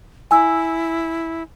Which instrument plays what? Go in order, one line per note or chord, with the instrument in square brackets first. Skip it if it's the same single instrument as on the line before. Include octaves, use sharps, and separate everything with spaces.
[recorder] E4 [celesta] G#5 E6